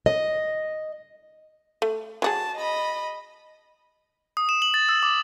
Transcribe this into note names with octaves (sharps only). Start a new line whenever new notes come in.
D#5
A3
F#3 F#4 G#4 A5
D#5 B5
D#6
E7
F#7
A6
E6
D6